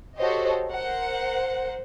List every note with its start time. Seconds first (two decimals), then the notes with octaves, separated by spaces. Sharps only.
0.18 F#4 G4 A4 C5 C#5 D#5
0.69 A#4 C5 F#5